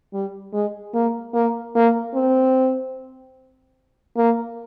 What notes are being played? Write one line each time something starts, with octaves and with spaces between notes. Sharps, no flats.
G3
G#3
A#3
A#3
A#3
C4
A#3